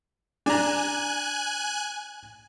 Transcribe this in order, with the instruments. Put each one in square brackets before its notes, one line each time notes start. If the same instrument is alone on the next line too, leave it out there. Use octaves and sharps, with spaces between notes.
[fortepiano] D4 A#5 [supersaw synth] G#5 F#6